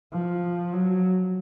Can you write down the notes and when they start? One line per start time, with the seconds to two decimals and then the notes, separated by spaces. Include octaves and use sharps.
0.13 F3
0.73 F#3